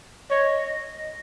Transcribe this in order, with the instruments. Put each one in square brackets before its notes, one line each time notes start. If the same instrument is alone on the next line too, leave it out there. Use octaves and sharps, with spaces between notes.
[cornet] C#5 [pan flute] D#5